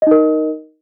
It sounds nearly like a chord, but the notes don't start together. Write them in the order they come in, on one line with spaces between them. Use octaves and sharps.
D#5 D#4 A#4